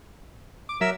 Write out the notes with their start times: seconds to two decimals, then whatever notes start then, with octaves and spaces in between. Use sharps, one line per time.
0.69 D6
0.81 F#3 A#4 E5 E6